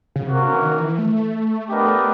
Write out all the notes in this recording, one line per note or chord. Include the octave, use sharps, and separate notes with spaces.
C#3
C3 A#3 C#4 F#4 A#4
D3
E3
D#3
E3
A3
B3 D4 G4 A#4 D#5